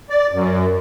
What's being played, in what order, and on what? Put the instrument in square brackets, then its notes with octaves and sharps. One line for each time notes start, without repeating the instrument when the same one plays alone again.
[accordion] D5
F#2